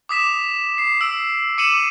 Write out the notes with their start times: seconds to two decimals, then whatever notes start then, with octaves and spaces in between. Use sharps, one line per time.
0.09 D6 D#6 B6 E7
0.78 C7
1.01 E6 D7
1.58 D6 C#7 D#7 E7 F#7